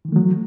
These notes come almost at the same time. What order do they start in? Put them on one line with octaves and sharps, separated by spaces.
D#3 E3 A3 F#3